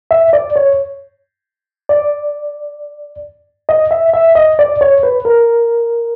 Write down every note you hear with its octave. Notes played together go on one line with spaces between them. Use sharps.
E5
D5
C#5
D5
D#5
E5
E5
D#5
D5
C#5
B4
A#4